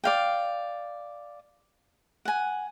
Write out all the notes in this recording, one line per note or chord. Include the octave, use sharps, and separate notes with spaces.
D5 F5 G5
F#5 G#5